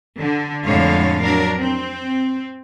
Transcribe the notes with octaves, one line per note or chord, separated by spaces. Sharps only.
D3
F2 A2 D3 G#3 C#5 F5
F#3 D4 A#4
C4